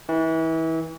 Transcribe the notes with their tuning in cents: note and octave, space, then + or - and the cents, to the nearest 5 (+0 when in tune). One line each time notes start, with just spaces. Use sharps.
E3 -30